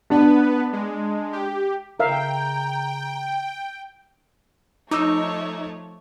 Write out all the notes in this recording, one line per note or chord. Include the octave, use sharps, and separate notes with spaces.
B3 D4 B4
G#3
G4
C#3 A#4 E5 F5 G5 A#5
F3 A3 D#4 C#5 D6 E6